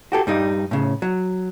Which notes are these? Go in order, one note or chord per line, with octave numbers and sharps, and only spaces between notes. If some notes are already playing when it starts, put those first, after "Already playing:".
F#4 G4 A4
G2 G3 D#4
A2 C#3
F#3